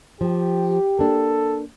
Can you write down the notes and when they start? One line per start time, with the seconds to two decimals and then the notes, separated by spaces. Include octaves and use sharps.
0.21 F3 G4
0.99 A#3 D4 A4